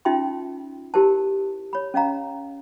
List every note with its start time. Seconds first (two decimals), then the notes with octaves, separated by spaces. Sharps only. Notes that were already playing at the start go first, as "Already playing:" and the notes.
0.05 C#4 D#4 F4 E5 G5 C6
0.94 E4 G4 A#4 C5 A5
1.73 C#5 B5
1.94 C#4 D#5 F5 A#5